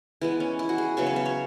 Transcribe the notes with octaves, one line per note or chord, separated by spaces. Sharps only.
E3 G#3 B3 E4
C#4
E4
F#4
G#4
C#3 F#3 B3 E5
C#5
E5
C#5